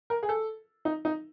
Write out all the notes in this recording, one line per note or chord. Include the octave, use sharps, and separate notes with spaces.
A#4
G#4
A4
D#4
D#4